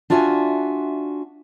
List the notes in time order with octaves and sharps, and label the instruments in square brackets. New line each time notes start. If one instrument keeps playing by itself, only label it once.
[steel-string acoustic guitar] D4 F4 F#4 E5 G#5